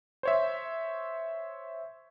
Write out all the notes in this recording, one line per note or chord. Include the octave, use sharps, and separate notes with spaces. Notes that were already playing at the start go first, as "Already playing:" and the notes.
C5 C#5 E5